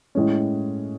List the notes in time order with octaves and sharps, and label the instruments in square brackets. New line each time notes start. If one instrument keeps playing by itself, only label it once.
[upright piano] A2 G#3 C#4